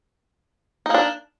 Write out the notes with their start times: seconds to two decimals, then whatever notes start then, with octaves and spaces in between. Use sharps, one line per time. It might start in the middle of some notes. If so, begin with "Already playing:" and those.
0.86 D#4
0.90 A#3
0.94 D4